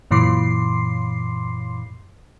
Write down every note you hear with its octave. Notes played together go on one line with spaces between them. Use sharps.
F#2 A#2 E3 C6 D6 C7